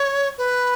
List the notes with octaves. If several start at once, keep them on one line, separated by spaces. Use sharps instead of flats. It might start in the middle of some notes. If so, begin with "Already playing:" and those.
Already playing: C#5
B4